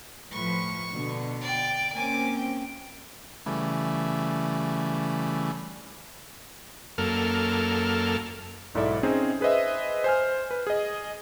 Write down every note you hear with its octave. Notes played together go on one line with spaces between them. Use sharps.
A2 F3 B4 C#6
B2 D3
D5 G5
A#3 C4 C#4 G#5 D6
G5
C#3 E3 G3 A3
F#2 A#3 A4 F6
B1 G#2 E4 A4 D5 E5
C4 C#4 D#4 G#4 C5
G#4 B4 C5 D#5 E5
C5 G#5 F6
B4
G#4 D#5